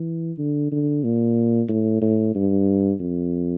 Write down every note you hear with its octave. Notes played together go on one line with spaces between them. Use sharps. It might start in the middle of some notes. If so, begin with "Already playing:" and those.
Already playing: E3
D3
D3
A#2
A2
A2
G2
F2